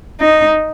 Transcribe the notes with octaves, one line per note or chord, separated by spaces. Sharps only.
D#4